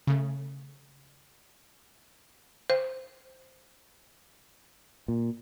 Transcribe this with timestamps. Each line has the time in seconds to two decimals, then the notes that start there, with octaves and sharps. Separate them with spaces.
0.07 C#3 A3
2.70 C5
5.08 A#2